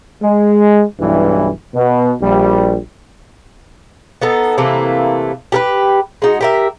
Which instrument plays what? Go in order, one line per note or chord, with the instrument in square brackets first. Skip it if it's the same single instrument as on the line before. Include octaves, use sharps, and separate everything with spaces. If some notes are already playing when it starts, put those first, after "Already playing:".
[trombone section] G#3
B1 G2 E3
B2
A#1 G3
[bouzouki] B3 D#4 A4
C3 E3 A3 A#3
G4 A#4 B4
G#3 D#4 F#4
G4 A#4 E5